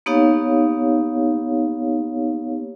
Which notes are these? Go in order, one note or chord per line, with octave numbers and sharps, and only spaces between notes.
A#3 B3 D#4 G4 C#5 F5